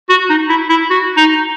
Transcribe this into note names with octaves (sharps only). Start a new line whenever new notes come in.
F#4
D#4
E4
E4
F#4
D#4